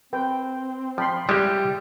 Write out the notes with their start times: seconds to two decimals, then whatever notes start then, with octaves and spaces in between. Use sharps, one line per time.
0.13 C4 B4 G5
0.98 F3 G5 B5 C6
1.29 G3 G#3 E4 G4